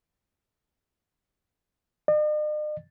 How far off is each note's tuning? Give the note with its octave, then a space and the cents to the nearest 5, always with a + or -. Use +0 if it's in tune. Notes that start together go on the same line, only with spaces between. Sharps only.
D#5 -45